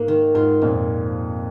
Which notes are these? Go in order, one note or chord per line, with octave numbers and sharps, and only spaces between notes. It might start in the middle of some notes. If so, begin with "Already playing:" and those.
Already playing: G#2 A#3
D#3
G#2 F4
F2 A#2 F3